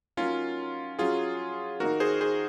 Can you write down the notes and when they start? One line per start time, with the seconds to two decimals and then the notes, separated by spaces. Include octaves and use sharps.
0.17 F#3 A#3 C#4 D#4 F4
0.99 F#3 C#4 F4 F#4 G#4
1.80 D#3 A#3 D#4 F#4 A#4
2.00 G#4 C5
2.21 G#4 C5